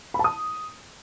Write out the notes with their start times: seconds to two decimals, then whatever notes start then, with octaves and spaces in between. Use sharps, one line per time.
0.14 B5
0.19 A5
0.24 D#6